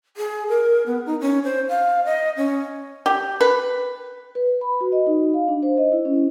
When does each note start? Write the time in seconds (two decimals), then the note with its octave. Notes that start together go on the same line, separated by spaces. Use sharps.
0.17 G#4
0.49 A#4
0.86 B3
1.06 D#4
1.21 C#4
1.44 C5
1.69 F5
2.05 D#5
2.37 C#4
3.06 G4
3.41 B4
4.35 B4
4.61 B5
4.81 F#4
4.92 D#5
5.07 D#4
5.34 F5
5.48 D4
5.63 C5
5.77 D#5
5.92 E4
6.05 C#4